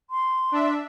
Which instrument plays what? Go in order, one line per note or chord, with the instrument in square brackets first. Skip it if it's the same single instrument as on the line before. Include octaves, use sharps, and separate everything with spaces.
[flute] C6
[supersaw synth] D4 E5